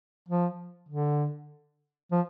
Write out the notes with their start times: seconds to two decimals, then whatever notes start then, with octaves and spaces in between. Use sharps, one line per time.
0.29 F3
0.89 D3
2.12 F3